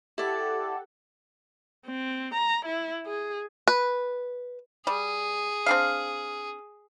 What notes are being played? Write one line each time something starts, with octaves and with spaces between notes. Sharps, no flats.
E4 G4 A4 D5 F#5
C4
A#5
E4
G#4
B4
G3 G#4
C4 D4 F5